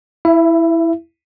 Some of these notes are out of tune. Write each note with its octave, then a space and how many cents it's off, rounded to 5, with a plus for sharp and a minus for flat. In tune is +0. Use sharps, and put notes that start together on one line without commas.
E4 +0 E5 +30